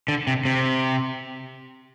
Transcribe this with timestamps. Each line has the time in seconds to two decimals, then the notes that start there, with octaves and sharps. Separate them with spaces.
0.08 D3
0.27 C3
0.45 C3